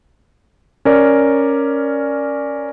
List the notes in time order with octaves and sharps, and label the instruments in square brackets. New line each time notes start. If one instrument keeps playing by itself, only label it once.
[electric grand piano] C#4 A#4 D5